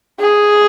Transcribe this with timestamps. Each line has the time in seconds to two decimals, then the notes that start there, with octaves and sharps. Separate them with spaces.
0.20 G#4